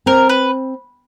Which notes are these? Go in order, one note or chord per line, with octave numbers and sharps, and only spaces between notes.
C4 A#4
B4